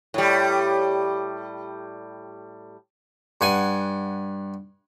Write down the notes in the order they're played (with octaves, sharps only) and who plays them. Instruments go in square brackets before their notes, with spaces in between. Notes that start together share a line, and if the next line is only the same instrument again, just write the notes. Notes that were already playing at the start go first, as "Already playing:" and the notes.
[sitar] A2 G3
[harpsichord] G2 F#5 G#5